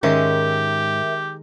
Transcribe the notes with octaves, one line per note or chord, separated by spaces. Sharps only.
G#2 D#3 G#3 C#4 G4 A#4 C5 E5